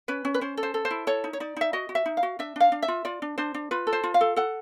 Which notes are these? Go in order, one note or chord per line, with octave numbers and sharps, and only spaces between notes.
C#4 B4
C#4
B4
C#4 C5
A4
C5
A4
C5
E4
A4 C#5
D#4
C#5
D#4 D5
D#4 E5
F#4 D#5
F#4
E5
D#4
F5
F#4
D4 E5
D4 F5
D4
E5
F4
F4 D5
D4
D4 C5
D4
F4 B4
A4
C5
F4
F5
A4
A4 F#5